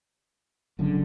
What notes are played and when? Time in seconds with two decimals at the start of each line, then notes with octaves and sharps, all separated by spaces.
0.79 F#1 F#2 D3